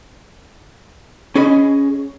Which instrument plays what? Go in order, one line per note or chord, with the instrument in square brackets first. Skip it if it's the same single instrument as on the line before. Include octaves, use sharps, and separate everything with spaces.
[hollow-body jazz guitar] C#4 G#4 D#5 B5